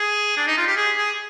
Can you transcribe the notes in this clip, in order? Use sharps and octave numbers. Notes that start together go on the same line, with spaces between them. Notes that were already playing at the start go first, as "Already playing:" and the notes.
Already playing: G#4
D4
D#4
F4
G4
G#4
G#4